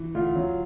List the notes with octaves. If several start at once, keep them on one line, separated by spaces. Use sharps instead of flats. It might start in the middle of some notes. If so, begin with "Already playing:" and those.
Already playing: E3
D2 F4
F#3